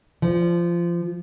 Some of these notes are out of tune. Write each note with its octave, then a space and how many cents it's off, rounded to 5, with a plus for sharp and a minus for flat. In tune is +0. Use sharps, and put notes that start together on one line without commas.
F3 -20